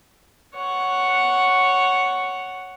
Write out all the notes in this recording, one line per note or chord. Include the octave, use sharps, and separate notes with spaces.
C#5 F#5